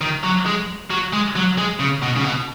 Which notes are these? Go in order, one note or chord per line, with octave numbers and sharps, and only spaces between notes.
D#3
F#3
G#3
F#3
G#3
F#3
G#3
C#3
B2
C#3
B2